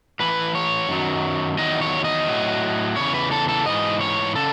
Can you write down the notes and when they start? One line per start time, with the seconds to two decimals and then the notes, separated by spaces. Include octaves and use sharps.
0.20 A2 E3 B4
0.55 C#5
0.89 F#2 D#3 F#3
1.58 E2 D#3 F#3 D#5
1.81 C#5
2.04 D#5
2.27 A2 F#3
2.96 E2 C#3 E3 C#5
3.14 B4
3.31 A4
3.49 A4
3.66 G#2 E3 D#5
4.01 C#5
4.35 C#3 A4